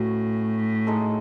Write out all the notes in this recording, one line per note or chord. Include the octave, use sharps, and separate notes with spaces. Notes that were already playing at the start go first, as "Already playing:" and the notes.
Already playing: A2 F#3 C#4 F#4
G#3 D#4 A4